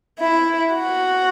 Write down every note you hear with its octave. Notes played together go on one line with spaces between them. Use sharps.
E4
F#4